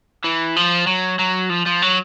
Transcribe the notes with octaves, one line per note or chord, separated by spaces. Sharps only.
E3
F3
F#3
F#3
F3
F3
F#3